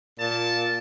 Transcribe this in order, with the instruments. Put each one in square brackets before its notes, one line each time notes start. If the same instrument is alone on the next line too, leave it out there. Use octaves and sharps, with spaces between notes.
[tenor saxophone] A#2 [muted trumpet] A5